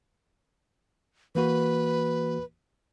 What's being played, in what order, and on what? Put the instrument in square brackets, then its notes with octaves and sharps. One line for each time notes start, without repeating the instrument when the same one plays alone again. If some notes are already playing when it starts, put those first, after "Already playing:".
[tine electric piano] E3 A#3 F#4 [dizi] B4